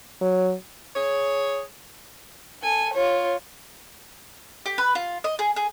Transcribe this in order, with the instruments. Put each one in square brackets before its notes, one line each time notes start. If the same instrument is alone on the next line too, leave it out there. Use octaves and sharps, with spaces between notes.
[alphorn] F#3
[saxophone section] G#4 C#5
[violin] A4 G#5
F4 C#5
[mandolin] G4
B4
F4
D#5
G#4
G#4